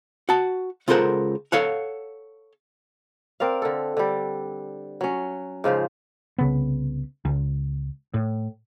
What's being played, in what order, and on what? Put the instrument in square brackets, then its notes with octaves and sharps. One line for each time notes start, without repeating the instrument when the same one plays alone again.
[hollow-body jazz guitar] F#4 A5
C#2 F4 A4 A#4 C5 F#5
A4 C#5 F5 F#5
[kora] C4 A#4 D5 F5
D3 A4
D3 G3
F#3 C#4
G#2 C#3 F3 C5
[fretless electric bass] C2 C#3 B3
C#2
A2